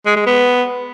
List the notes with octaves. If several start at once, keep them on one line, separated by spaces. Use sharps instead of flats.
G#3
G#3
B3